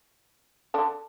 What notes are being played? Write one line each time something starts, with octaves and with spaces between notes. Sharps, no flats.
D3 D4